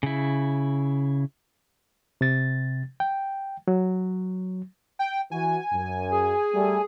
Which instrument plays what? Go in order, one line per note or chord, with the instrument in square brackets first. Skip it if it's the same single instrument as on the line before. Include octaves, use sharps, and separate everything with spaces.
[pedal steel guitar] C#3 E4
[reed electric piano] C3 A6
G5
F#3
[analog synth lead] G5
[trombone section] E3 F#4 [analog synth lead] G#5
[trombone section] F#2
[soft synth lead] G#4
[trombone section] G3 A3